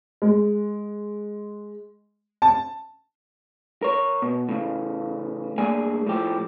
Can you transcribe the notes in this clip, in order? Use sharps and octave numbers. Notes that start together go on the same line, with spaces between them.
G#3
A5
A#4 C#5
B2
A2 C#3
G2 A3 A#3 G#4 D5 G#5
A2 F3 G4